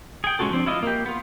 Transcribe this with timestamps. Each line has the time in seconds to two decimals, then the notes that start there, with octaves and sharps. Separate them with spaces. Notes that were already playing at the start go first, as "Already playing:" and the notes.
0.24 G#4 G5
0.39 G#3 C#4 F4 F#4 A4
0.51 F3 C4 D4
0.66 E4 F4 D#5
0.83 A#3 G4
1.06 B3 F4